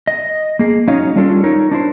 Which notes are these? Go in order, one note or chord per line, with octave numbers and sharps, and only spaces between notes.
D#5
A#3 G#4
F#3 C#4 D#4 C#5 D#5 F5
G3 C#4 D4 F4 A4
D#4 A#4 C#5
D4 E4 C5